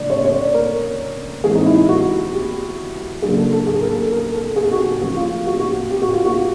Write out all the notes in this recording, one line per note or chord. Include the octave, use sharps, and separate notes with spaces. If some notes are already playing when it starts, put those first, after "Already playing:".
Already playing: C#3 F3 A3 D4 D5
C#5
C#5
D5
A#4
E3 G#3 C4 G#4
D#4
E4
F#4
G4
C#3 F#3 A#3 D4 G#4
A4
A4
G#4
A#4
A4
A#4
A4
G#4
F#4
G4
F3 A3 C#4 F#4
F4
F#4
F#4
G4
G4
F#4
F4
F#4